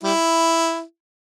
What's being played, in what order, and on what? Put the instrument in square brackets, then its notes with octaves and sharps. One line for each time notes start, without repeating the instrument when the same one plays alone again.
[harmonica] G3 E4